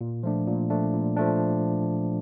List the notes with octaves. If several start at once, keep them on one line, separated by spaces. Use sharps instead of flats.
A#2
F3 A3 D4
A#2
F3 A3 D4
A#2
F3 A3 D4